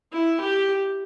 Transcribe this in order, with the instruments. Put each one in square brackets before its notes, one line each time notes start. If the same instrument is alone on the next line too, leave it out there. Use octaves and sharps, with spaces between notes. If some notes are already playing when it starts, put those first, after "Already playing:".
[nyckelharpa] E4
G4